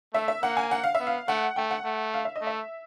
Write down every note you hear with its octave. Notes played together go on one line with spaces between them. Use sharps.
A3 E5
E5
A#3 F#5
G#5
F#5
F5
E5
B3
F5
A3 F#5
A3 G5
F#5
A3
F5
E5
D#5
A3
E5